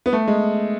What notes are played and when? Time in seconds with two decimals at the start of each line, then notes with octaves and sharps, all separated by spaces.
0.06 B3
0.13 A3
0.28 G#3